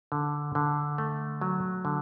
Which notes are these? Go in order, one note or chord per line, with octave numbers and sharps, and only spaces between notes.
D3
D3
A3
F#3
D3